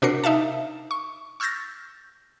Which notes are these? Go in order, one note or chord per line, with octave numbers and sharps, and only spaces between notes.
C3 D4 F#4 A#4 C7 C#7
D#4 E5 F5 A5
C#6
C#6 E6 F6 G6 A6 A#6